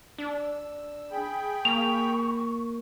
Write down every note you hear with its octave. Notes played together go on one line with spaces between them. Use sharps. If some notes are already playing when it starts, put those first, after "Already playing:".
D4 E6
G#4 G5 B5
A#3 C#6 F7